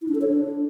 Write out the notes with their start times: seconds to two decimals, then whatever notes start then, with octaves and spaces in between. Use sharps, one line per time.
0.02 E4
0.08 D4
0.15 A4
0.21 C#5
0.28 D4